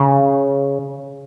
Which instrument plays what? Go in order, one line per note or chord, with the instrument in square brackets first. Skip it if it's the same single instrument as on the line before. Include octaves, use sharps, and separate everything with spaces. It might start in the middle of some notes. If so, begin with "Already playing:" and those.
Already playing: [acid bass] C#3